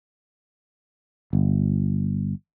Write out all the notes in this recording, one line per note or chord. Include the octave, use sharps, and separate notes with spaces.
G1